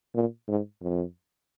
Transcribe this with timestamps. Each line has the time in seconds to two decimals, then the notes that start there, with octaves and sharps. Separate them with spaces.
0.15 A#2
0.48 G#2
0.82 F2